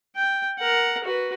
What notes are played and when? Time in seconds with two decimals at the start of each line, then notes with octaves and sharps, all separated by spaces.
0.16 G5
0.59 A#4 F#5
1.04 F#4 B4